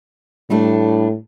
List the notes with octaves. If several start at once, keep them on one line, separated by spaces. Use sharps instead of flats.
A2 G3 A3 D4